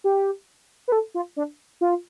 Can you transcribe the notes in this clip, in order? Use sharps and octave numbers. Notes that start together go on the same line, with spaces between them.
G4
B4
A4
F4
D4
F4